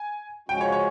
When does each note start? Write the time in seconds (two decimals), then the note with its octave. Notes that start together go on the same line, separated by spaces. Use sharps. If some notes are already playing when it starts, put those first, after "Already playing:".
Already playing: G#5
0.48 C#3 F3 G#3 C#4 F#4 G5
0.61 C#5
0.72 C#5